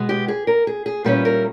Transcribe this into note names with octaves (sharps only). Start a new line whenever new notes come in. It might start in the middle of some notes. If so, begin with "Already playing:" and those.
Already playing: B2 G#3 B3
G4
G#4
A#4
G#4
G#4
A#2 G3 C#4 E4 B4
A#4